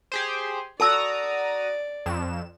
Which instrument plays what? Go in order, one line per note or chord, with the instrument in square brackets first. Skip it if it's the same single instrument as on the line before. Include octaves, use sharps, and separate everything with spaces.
[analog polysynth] G4 G#4 C5
[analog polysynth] F#4 A#5 D#6 [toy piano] A4 A5 E6 [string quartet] D5
[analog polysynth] F2 E7